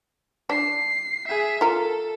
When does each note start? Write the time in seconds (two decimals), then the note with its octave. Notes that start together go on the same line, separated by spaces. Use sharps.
0.50 D4 C7
1.28 G#4 E5
1.61 F4 A4 A#4